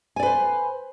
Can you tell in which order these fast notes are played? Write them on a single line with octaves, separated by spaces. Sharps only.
G#5 D5 B4 C5